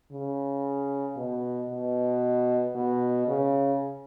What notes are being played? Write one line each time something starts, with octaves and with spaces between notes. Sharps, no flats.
C#3
B2
B2
B2
C#3